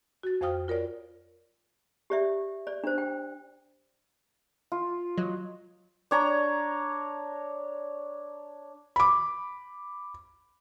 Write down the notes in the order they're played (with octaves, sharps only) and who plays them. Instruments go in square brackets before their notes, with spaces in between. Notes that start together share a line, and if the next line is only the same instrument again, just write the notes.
[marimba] F#4 A6
F2 C5 F5 G5 D#6 F6
F4 A#4 C#5 D5
[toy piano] G4 D5 E5
D5
D4 C5
G5
[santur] F4
[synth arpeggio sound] F#3 [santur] D#5
[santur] D4 C#5 A#5
[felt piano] B5 D6